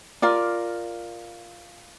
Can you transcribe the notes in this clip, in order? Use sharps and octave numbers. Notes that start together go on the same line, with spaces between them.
F4 A#4 D5